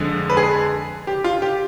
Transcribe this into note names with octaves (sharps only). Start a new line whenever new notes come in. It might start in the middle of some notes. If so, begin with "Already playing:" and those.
Already playing: F2 D3 G#3
B4
G#4
G4
F4
G4